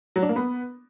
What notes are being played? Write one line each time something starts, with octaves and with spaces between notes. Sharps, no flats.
F#3
D4
A#3
B3